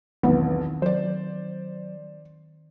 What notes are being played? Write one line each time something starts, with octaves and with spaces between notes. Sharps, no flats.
B1 E2 D#3 B3 C4
F#3 C5 D5